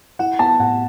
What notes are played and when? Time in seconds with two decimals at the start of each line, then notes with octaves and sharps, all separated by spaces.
0.19 E4 F#5
0.39 B3 A5
0.60 A2 F#5